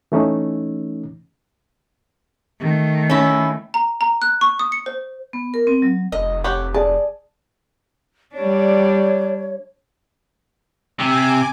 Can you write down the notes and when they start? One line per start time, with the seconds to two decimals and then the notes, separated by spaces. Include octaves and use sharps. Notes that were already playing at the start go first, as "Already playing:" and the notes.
0.12 E3 A3 C#4 D#4
2.60 D#3 A3
3.10 C#4 E4
3.74 A#5
4.01 A#5
4.22 F#6
4.41 C#6
4.59 D#6
4.72 C#7
4.86 C5
5.33 B3
5.54 A#4
5.67 C4
5.82 F#3
6.12 F1 D#5
6.44 G4 C#5 F#5
6.74 G#4 D5 A5
8.35 G3 D4 C#5
11.00 C3 G#5 D6